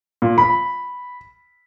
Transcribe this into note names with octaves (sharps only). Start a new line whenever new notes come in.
A#2
B5